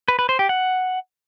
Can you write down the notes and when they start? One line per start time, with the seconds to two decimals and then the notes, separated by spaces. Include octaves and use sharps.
0.08 B4
0.19 B4
0.29 C5
0.39 G4
0.49 F#5